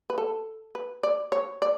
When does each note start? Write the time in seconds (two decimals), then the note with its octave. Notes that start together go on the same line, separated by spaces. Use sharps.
0.10 B4
0.18 A4
0.75 B4
1.03 D5
1.32 C#5
1.62 D5